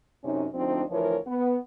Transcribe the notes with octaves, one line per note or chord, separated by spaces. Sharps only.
F#2 C3 C#4 D#4
D2 F3 C4 D4 D#4
D2 E3 F3 A#4 C#5
B3